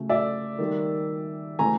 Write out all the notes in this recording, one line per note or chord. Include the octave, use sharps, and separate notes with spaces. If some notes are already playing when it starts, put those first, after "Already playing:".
Already playing: C#3 F#3 A3
D5 E5
D#3 G3 A#3
C#3 E3 A3 G#5 A#5